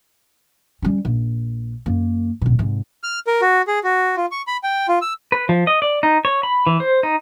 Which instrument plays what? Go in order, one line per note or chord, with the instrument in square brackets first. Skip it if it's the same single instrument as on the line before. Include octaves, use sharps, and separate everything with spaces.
[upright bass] G3 C#4
A#1
F#2 A#3
D1 B2
G#2 C3
[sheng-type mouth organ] F6
A#4
F#4
G#4
F#4
F4
C#6
B5
G5
F4
E6
[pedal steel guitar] B4
F3
D#5
D5
D#4
C#5
B5
E3
C5
D#4